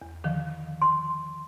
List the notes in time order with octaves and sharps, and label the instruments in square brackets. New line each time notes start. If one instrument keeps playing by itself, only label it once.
[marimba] E2
D3 D#3 F3
[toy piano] C6